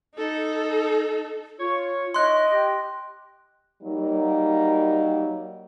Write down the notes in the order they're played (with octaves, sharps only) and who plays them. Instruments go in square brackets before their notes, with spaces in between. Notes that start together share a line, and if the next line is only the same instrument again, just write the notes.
[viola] D#4 A4
[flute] F4 [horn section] C#5
[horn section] D#4 E4 C#5 [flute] D#5 [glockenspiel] C6 F#6
[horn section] G4
[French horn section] F#3 G3 A#3 D#4